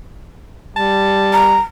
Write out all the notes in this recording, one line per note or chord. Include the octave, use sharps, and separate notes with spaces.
G3 A5
A#5